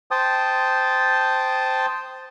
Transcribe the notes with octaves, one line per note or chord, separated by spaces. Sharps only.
C5 G5 A5 D#6